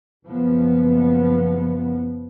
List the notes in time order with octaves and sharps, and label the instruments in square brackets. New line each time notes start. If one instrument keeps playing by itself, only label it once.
[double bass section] F#1 F3 B3